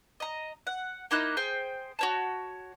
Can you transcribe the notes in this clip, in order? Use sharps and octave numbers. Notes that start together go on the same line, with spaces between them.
D#5 A#5
F#5
A#3 D#4 E4 F#6
G#4 C5 G5
F#4 C#5 A5